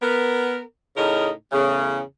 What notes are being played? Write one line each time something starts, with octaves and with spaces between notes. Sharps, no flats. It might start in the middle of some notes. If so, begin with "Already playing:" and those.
B3 A#4
A2 C#3 D#4 A#4 D#5
E2 A2 C#3